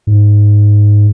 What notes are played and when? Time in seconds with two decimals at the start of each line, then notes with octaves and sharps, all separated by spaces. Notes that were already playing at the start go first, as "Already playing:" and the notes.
0.07 G#2